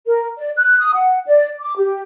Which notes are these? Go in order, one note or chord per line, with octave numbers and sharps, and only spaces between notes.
A#4
D5
F#6
D#6
F#5
D5
D6
G4